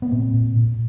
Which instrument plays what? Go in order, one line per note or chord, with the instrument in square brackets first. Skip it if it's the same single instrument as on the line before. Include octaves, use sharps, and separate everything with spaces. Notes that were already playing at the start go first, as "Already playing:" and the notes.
[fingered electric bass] B3
A#2 A#3 C4
A#2
A#2